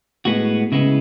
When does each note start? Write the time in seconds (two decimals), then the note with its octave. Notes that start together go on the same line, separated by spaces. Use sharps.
0.25 A2 G#3 B3 F#4
0.72 C#3 G#3 B3 E4